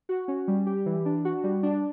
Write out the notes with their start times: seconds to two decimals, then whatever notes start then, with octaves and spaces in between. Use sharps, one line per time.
0.09 F#4
0.28 C#4
0.48 G3
0.66 G4
0.86 E3
1.06 D4
1.25 F#4
1.44 G3
1.63 D4